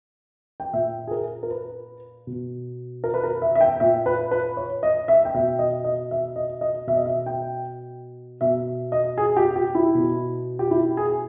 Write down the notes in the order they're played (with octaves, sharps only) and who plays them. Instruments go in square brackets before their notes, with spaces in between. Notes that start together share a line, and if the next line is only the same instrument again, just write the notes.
[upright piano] G5
A#2 E5
G#4
A#4
A#4
B4
B2
A#4
B4
A#4
E5
E5
G5
A#2 E5
B4
B4
C#5
D#5
E5
G5
B2 E5
D#5
D#5
E5
D#5
D#5
B2 E5
D#5
E5
G5
B2 E5
D#5
G#4
G4
G4
E4
B2
G4
E4
G#4